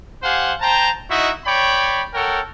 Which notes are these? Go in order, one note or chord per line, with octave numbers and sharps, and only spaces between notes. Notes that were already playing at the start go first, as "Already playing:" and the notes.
G4 C5 F5 F#5 G#5
C5 G5 A5 A#5
D#4 E4 F#4 D#5 E5
C#5 D5 G5 B5
A4 A#4 C#5 F#5 G5